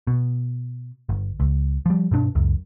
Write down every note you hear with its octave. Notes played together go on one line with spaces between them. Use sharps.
B2
G1
C#2
F3 G3
G2 B2 C4 D4
C#2 F#2